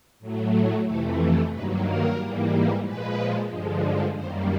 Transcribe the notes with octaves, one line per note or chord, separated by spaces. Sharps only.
A2 F#3 A3
F2 C3 E3 A3 A4
G2 D#3 F#3 A#3 B4
A#4
G#2 E3 G3 A#3
A#2 F3 G#3 B4
G2 D3 F3 G#3
F#2 D#3 G3 A#3 C5